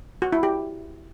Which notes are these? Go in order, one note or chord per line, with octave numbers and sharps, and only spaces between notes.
F#4
E4
G4